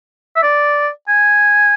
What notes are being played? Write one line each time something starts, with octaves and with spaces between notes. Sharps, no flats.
E5
D5
G#5